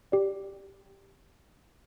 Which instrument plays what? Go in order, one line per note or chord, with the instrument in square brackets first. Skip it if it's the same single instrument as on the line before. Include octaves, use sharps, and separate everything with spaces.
[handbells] G4 D5